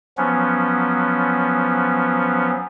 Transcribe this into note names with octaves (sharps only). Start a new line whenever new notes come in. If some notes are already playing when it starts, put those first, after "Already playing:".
F3 F#3 B3 C#4